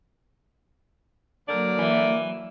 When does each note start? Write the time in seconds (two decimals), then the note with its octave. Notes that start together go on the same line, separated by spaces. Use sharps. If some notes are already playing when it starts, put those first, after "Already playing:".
1.49 D3 F#3 A#3 A#4 D5
1.78 E3